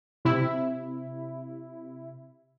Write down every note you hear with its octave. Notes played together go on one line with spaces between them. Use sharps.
C3 E4